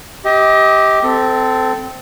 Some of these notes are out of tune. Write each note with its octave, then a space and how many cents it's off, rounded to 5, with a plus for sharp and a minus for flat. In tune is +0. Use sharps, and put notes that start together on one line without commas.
G4 +0 D#5 +35
C4 -20 A4 +0